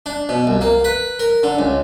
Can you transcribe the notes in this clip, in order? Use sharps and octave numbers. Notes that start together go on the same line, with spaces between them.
D4
B2
C2
A#3
B4
A#4
D3
C#2